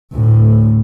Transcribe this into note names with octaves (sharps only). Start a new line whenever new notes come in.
D2 A2